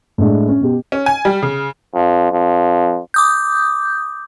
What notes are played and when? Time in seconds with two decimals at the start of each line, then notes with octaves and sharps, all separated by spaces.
0.18 A2 G#3 D4
0.48 C#4
0.61 B2 G4
0.92 C#4
1.06 G#5
1.25 G3
1.42 C#3
1.94 F2
2.31 F2
3.14 D6 D#6 G6